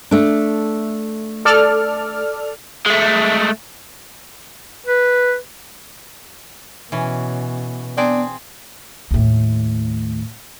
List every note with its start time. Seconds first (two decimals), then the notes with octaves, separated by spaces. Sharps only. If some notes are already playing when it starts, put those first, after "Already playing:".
0.11 A3 D4
1.45 A4 D5 F6
2.86 G#3 A3
4.87 B4
6.92 B2 E3 C#4
7.97 B3 C4 D4 G#4
9.11 D#2 A2